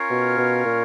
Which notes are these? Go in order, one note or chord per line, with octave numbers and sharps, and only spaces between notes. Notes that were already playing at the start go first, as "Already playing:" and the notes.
Already playing: C#4 F4 A#4 C#5 F5
B2
B2
A#2